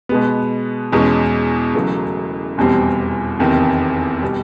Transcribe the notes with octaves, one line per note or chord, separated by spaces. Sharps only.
B2 G#3 B3
E2 B2 G#3 C#4
E1 E2 C#3 F#3 A3
F1 E2 B2 G3 C4
F1 E2 C3 D#3
B2 G3